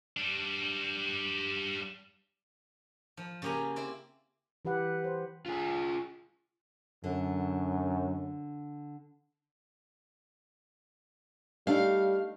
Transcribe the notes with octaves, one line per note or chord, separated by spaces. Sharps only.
G3 D4
F3
C#3 A#3 G4 G#5 A#5
C4 E4 D5
E3 G4 B4 F#5
C5
F4 G#4
F#2 D3
G3 A3 D4 D#4 F5